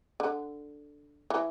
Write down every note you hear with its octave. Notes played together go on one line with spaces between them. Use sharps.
D3
E3